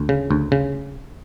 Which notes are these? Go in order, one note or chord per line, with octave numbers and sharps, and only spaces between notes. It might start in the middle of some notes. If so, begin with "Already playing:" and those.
Already playing: D2
C#3
D2
C#3